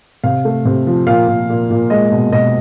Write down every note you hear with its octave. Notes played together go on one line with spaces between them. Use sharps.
C3 F5
A3
C3
F3
A#2 F5
A#2
A#2
A#2
G#3 D#5
B2
B2 D#5